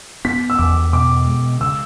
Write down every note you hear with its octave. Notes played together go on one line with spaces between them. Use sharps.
B3 B6
E6
E2 D6
B2 D6
G#3
C#3 E6